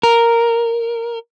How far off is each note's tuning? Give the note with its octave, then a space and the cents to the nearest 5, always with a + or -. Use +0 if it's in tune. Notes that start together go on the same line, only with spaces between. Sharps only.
A#4 -5